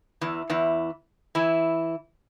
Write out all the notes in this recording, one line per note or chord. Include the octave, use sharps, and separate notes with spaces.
E2 E3
E2 E3
E3 E4